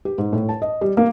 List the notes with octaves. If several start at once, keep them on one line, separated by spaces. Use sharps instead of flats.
G4
G#2
A2
A5
D#5
G3
A#3